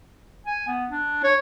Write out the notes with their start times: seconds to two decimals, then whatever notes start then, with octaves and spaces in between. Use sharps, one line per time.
0.46 G#5
0.68 B3
0.90 D4
1.23 C#5